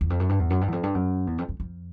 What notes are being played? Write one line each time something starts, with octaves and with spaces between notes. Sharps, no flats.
E2
F2
F#2
G2
E2
F#2
G2
E2
F2
G2
F#2
E2
F2
F2
F2